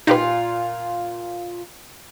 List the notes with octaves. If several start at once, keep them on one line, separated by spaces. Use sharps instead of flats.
A#2 D#4 F4 G4 B4